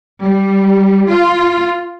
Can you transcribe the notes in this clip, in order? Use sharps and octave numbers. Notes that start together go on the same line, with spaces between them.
G3
F4